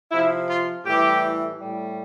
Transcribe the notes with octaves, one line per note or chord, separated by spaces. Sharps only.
C3 F3 E4
F4
A2 E3 G3 G4
A2 G3